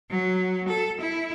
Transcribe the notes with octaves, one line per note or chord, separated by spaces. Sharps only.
F#3
A4
E4